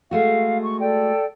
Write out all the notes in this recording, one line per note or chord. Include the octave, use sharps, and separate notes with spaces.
G#3 A3 F#4 F5
C#6
A4 D5 G5